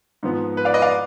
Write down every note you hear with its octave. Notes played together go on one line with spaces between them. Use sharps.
G#2 F3 B3
B4
D5 F5
B4 D#5
D5 F5